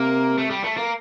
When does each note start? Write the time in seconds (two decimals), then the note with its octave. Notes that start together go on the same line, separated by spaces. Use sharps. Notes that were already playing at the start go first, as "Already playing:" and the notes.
Already playing: C3 A#3
0.38 A3
0.50 G3
0.64 A3
0.77 A#3